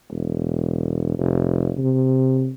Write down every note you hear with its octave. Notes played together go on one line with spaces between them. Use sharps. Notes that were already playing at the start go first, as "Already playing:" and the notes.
E1
F1
C3